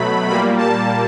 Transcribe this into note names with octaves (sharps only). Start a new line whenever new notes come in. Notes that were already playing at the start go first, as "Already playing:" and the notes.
Already playing: B2 F#3 A3 B5
A#2 G3 A#3 B5
A5